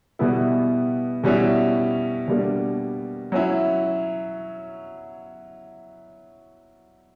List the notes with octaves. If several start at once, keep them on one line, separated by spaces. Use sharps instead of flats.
B2 G3 B3 E4
B2 G3 C#4 E4
B2 G3 A#3 D4
F#3 C#4 E4